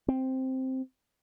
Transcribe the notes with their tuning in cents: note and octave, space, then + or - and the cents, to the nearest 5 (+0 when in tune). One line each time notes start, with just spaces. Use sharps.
C4 +0